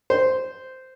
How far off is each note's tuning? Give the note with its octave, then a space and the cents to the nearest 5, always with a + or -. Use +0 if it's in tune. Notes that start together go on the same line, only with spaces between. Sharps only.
C5 -10